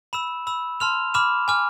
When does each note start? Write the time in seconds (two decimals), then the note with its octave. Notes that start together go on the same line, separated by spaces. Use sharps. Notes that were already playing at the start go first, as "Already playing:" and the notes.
0.13 B5 E6 E7
0.47 B5 E6
0.80 A5 C6 F6 F7
1.14 B5 D6 F6 E7
1.48 G#5 D6 F6